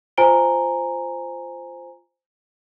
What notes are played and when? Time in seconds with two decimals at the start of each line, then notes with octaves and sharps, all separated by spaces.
0.18 F4 C5 G#5 A#5 D7 G7